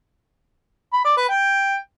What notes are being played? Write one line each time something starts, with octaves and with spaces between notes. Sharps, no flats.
B5
D5
B4
G5